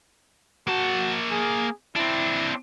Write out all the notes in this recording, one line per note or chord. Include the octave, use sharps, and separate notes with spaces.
A#3 F#4 A5
G#4
C4 D4 E4